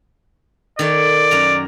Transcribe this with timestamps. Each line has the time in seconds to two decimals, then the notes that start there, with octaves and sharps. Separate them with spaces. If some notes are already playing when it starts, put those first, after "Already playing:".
0.79 D#3 A4 C#5 D5
1.31 F#2 A#4 A#5